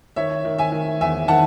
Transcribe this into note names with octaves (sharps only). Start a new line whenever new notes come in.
D#3 C#5 E5
D#3
E5 G#5
D#3
E2 E5 G#5
D#3 F#5 A5